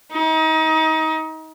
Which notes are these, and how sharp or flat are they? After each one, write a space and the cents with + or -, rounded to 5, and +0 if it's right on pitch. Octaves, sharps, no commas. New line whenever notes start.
D#4 +30